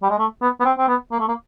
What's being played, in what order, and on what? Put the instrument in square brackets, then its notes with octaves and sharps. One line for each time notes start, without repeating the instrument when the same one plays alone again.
[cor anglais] G3
G#3
A3
B3
B3
C4
C4
B3
A#3
A3
A#3